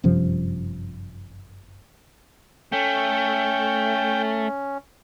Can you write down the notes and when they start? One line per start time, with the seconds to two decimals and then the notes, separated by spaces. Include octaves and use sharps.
0.04 G1 F#2 C3 F3
2.72 A3 C#4 G5